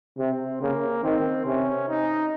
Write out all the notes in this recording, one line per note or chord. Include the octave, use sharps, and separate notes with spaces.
C3 C4
C#3 A#3
D#3 C4
C3 C#4
D#4